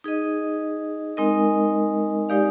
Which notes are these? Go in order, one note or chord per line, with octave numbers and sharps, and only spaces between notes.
D#4 G#4 D#5
G#3 C4 D#4 A#4 D#5
G#3 D#4 G4 D5 F5